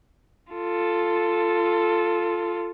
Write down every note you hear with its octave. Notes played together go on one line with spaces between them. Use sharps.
F4 A4